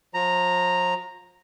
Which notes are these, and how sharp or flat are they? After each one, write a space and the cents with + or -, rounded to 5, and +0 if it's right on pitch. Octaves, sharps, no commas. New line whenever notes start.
F3 +35 A#5 -5